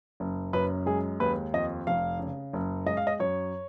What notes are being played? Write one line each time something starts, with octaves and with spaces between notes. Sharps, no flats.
F#1
F#2 B4
G#3 G#4
D#2 B4
F2 D#5
F1 F5
C#3
F#1
G#3 D#5
F5
D#5
F#2 C#5